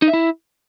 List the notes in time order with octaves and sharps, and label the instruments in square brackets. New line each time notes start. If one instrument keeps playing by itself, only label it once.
[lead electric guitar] D#4
E5
E4